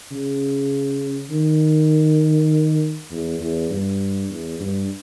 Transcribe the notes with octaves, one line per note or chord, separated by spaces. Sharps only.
C#3
D#3
E2
E2
G2
E2
G2